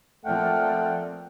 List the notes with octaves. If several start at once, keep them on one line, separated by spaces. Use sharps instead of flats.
F3 A3 A#3 C4 D5 F#5 G5 F6